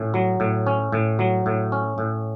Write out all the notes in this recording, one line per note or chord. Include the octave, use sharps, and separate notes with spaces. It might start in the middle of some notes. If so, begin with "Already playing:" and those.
Already playing: A2 C#4
F#3
A2
C#4
A2
F#3
A2
C#4
A2